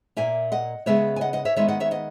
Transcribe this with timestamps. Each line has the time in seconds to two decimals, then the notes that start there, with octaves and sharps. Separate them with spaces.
0.17 A#2 A#3 E5 G#5
0.52 D#5 F#5
0.86 C#3 G#3 B3 C#5 E5
1.16 G#5
1.21 D#5 F#5
1.33 D#5 F#5
1.45 C#5 E5
1.56 D#3 G#3 B3 C#5 E5
1.68 D#5 F#5
1.80 C#5 E5
1.91 D#5 F#5